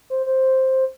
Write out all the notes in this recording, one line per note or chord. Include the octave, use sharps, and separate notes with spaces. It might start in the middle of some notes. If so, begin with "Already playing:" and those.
C5
C5